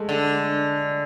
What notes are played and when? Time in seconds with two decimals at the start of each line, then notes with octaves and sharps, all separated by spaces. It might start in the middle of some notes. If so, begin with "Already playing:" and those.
Already playing: G#3 A3
0.09 D3